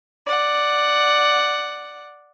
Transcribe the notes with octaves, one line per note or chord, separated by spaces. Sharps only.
D5 F#5